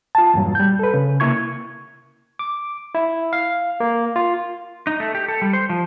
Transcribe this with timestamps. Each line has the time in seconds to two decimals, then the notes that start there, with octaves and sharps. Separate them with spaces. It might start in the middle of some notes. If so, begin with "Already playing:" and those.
0.15 F4 A5
0.34 E2 G2 A#2 F#3
0.55 G3 G6
0.79 A4 B4
0.94 C#3
1.20 C3 A#3 E4 C#6 G#6
2.39 D6
2.95 E4
3.33 F5
3.80 A#3
4.16 F4
4.87 D#4
5.00 A3
5.15 G4
5.28 A4
5.42 G3
5.53 C5
5.70 F3